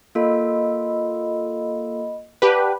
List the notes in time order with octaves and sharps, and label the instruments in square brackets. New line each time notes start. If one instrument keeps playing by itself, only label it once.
[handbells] A#3 F4 A4 [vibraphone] D#5 B5
[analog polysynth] G4 B4 [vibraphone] D5 F#5 A5